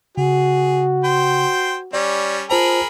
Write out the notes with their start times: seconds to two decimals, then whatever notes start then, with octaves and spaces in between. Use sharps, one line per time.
0.18 C#3 F#4 G#4
1.04 C5 G5
1.93 G3 C#4 D5
2.50 F4 G#4 A#4 C5 A5 B5